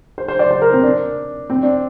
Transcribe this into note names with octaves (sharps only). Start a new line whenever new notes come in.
C5
C5
D5
C5
A#4
C4
D4
C4
D4